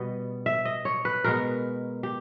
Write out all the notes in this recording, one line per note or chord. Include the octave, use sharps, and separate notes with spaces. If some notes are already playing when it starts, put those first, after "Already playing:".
Already playing: B2 G3 B3 D#5
E5
D#5
C#5
B4
B2 G#3 B3 A#4
G4